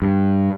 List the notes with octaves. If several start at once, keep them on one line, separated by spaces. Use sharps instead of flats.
G2